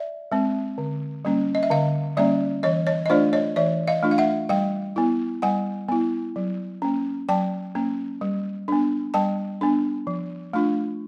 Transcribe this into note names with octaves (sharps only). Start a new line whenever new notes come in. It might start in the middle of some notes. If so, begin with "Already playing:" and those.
Already playing: D5 E5
G#3 C4
D3
G3 A#3 C#4
D#5
E5
D3 D#5 F5
G3 A#3 C#4 D5 E5
E3 C#5 D#5
C#5 D#5
D#5
A3 D4 F4 C5 D5
C#5 D#5
E3 D5 E5
D#5 F5
A3 D4 F4
F5
E5 F#5
G3 F5 G5
B3 E4
G3 F#5 G#5
B3 E4
F#3
A#3 C#4
F#3 G5 A5
A#3 C#4
G3
B3 D4
G3 G5 A5
B3 D4
F3
A3 D4 F4